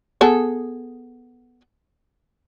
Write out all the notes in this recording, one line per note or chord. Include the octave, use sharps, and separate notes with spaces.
B3 G#4 A4